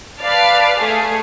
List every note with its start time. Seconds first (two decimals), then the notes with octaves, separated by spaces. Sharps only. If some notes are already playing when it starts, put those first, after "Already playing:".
0.20 B4 D5 F5 A5
0.81 A3 G#4